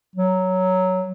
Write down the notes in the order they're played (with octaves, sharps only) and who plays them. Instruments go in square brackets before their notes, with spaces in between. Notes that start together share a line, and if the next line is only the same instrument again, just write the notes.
[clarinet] F#3